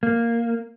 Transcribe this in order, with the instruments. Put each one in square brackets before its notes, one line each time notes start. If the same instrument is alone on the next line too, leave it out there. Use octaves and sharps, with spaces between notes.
[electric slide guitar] A#3